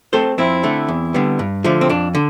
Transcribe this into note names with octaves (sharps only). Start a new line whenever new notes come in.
A3 C4 A4 C5
F2 C4 E4
D3 A3
E2
D3 G3 B3
G2
D3 F3 A3
C4
F2 D4
D3